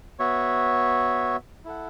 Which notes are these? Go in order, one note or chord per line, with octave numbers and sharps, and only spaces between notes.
B3 F#4 C#5 E5
E4 A4 F#5